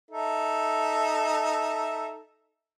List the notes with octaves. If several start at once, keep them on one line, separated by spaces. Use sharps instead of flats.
D#4 A4 E5